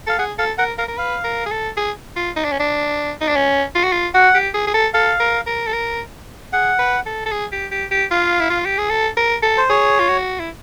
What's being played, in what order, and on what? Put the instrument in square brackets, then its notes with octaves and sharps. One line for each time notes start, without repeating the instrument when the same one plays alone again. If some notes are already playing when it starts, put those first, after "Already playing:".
[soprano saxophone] A4 [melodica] F5
[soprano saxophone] G#4 [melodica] F#5
[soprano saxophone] A4 [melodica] F5
[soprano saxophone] A#4 [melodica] F#5
[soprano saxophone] A#4 [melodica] F5
[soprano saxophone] A#4
[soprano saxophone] B4 [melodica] F5
[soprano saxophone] A#4
G#4
A4
G#4
F4
D#4
D4
C#4
D4
D#4
D4
C#4
F4
F#4
F4
[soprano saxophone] F#4 [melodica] F#5
[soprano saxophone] G4
G#4
G#4
A4
[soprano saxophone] A4 [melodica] F5
[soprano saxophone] A#4
A#4
A4
A#4
[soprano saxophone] G#4 [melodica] F#5
[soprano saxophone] B4
A4
A4
G#4
G4
G4
G4
[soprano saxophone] F4 [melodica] F5
[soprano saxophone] E4
F4
G4
G#4
A4
A#4
A4
[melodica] C5
[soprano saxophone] G#4 [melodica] C#5
[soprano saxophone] F4
F#4
E4